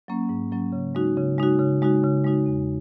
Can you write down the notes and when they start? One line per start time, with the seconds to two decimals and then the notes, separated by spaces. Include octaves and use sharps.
0.08 F#3 A#3 C#4
0.29 G#2
0.52 F#3 A#3 C#4
0.72 C#3
0.95 G#3 D#4 F#4
1.17 C#3
1.38 G#3 D#4 F#4
1.59 C#3
1.82 G#3 D#4 F#4
2.04 C#3
2.24 G#3 D#4 F#4
2.46 E2